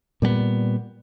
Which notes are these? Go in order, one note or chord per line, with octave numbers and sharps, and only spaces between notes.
A#2 G3 G#3 B3